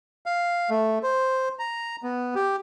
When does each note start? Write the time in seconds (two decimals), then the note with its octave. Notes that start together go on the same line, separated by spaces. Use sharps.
0.26 F5
0.70 A3
1.03 C5
1.59 A#5
2.03 B3
2.35 G4